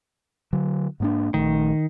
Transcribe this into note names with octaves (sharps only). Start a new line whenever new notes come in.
D3 F#3
G#2 A#3 D4
A#1 D#3 A3